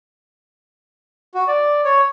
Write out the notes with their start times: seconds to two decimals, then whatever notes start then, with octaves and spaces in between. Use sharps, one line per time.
1.34 F#4
1.48 D5
1.85 C#5